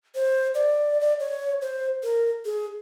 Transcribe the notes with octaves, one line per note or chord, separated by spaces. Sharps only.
C5
D5
D5
C#5
C5
A#4
G#4